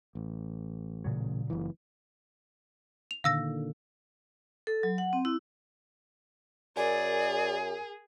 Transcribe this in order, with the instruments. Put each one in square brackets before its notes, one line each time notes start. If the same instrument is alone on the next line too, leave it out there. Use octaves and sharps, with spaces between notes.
[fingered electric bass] A1
[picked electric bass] A#2 C#3 F#3
[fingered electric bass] F#1 E3
[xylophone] F7
[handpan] A#2 D3 D#3 [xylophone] F5 E6 A#6
[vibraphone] A4
F#3
F#5
C4
E4
[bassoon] F#2 [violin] G#4 [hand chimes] A#4 G#5 [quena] D5